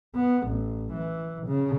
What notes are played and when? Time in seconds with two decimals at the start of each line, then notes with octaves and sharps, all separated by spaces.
0.16 B3
0.47 A1
0.93 E3
1.47 C#3